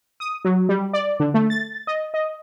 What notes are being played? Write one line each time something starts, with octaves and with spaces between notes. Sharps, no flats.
D#6
F#3
G3
D5
D3
A3
A6
D#5
D#5